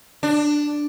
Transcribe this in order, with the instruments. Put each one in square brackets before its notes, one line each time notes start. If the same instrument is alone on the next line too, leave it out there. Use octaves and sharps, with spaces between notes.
[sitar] D4